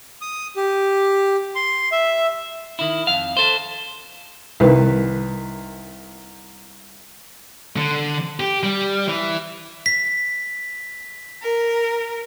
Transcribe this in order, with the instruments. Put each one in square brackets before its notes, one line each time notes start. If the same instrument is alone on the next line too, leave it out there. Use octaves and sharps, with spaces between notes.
[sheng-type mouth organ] D#6
G4
C6
E5
[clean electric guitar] D#3 E4
F2 F5
A4 C5
[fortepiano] C2 D#3 B4
[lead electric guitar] D3
G4
G3
E3
[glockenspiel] B6
[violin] A#4